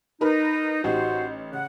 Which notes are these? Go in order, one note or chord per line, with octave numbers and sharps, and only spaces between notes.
D#4 A#4 B4
A1 D#4 F#4 G4 C5
C#3 F#5